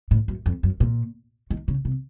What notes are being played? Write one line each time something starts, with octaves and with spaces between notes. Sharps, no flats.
A2
F#2
F2
F#2
A#2
D#3
C#3
C3